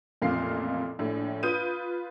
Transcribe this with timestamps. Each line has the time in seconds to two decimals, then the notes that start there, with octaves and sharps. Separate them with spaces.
0.22 A1 F2 A#2 A#3 F5 C7
0.99 A#1 A2
1.43 F4 B4 D#6 G6 D#7